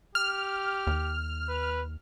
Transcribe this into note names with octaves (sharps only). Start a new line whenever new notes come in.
G4 F6
D#2
B4